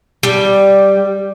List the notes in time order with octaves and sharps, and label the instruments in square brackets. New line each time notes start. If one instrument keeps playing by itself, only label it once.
[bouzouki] G3